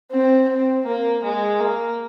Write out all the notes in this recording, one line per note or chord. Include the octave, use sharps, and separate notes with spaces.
C4
C4
A#3
G#3
A#3